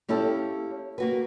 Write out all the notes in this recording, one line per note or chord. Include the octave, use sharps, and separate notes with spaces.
A#3 C#4 E4 G4 A4
A#3 F#4 B4